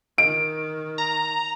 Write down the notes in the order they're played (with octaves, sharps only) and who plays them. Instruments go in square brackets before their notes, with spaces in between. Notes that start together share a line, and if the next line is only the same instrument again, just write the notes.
[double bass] D#3 [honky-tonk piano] D7
[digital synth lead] A#5